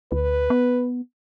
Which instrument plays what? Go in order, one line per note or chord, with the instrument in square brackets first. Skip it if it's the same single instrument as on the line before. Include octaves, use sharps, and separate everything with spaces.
[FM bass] D2 [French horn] B4
[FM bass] B3